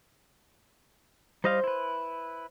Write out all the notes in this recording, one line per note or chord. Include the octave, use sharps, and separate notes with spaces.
G3 C5 D#5 F5
E4 B4